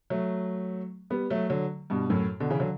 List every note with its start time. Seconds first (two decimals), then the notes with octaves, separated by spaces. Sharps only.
0.10 F#3 A3
1.10 G3 B3
1.30 F#3 A3
1.50 D3 F#3
1.90 G2 B2
2.10 F#2 A2
2.40 B2 D3
2.50 C#3 E3
2.60 D3 F#3